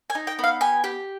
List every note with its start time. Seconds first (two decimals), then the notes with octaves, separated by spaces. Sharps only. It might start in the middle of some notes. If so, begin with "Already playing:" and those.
0.10 G#5
0.15 D#4
0.27 G5
0.39 B3 F5
0.61 G4 G#5
0.84 G4